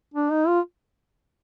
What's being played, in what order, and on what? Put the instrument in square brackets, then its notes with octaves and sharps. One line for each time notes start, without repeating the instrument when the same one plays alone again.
[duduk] D4
D#4
F4